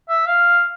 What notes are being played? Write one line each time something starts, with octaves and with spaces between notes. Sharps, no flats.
E5
F5